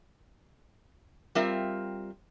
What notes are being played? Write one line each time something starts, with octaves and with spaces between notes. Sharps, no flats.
G3 C4 F4 A#4 E5